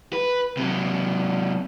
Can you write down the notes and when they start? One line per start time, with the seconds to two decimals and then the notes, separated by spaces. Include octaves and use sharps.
0.13 B4
0.57 C3 F#3